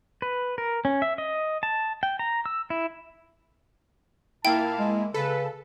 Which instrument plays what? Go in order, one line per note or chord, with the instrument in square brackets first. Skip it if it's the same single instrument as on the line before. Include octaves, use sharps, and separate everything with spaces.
[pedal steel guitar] B4
A#4
C#4
E5
D#5
A5
G5
A#5
E6
E4
[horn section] A#2 F5 A5 [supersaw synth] A#3 E4 [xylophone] G5
[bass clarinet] G#3
[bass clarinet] C#3 [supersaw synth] A4 [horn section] B4